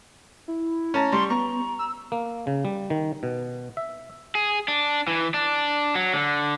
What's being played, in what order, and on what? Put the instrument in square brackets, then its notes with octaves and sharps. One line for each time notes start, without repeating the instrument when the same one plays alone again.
[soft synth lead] E4
[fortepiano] C#4 A5 A#5
[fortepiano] G3 [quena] C6 [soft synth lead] C#6
[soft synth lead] B3 [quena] A#5 [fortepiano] C#6
[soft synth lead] E6
[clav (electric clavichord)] A#3
C#3
G3
D#3
B2
E5
[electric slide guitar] G#4
D4
E3
D4
F#3
D3